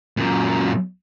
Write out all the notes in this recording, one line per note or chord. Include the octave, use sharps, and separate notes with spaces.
F#2 A#2